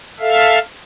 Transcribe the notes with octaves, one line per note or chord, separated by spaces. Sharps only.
A4 E5 F5